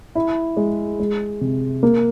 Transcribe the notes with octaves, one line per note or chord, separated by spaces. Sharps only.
E4
G#3
G#3
C3
A#3